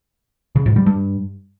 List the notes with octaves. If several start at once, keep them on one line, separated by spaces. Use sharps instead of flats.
C#3
G#2
G3
G2